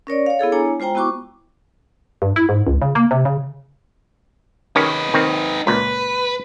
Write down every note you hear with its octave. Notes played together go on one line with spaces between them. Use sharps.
C#4 A#4 C#5 D5
C#5 F5
B3 E4 G#4 A4
D4 E4 C#5 G#5 A#5
G#3 F4 C5 G5 A#5
B3 E4 F#4 C#6 D6
G2
E4
G#2
C#2
C#3
A#3
C3
C#3
D#3 C#4 D#4 G4 B4
D#3 C4
C#2 A#2 B4